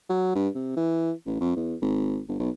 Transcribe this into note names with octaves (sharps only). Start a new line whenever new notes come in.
F#3
G2
C3
E3
A1
F2
E2
G#1
G1
B1